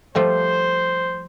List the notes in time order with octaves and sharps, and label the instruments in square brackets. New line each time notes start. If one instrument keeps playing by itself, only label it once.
[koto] F3 G3 A3 [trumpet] C5